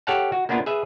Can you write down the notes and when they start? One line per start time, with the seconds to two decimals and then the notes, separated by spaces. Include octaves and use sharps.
0.07 G4 A4 C#5 F5 F#5 A5
0.32 F#4
0.49 A#3 B3 D4 E4 F4
0.66 G#4 B4 E5